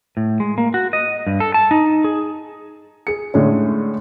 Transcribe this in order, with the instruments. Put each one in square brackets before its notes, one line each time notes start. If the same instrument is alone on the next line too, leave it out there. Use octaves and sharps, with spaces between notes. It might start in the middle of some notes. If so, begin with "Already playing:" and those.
[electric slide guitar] A2
G#3
A#3
F#4
D#5
G2
A4
A5
D#4
G#4
[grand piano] G#4 C#7
A2 D3 G#3 C#4